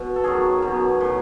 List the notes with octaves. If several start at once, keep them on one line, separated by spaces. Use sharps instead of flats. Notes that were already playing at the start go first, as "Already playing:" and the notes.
Already playing: B2
A4
F#2 D#3 F#3 G#4
B2 F#3
A2 F#3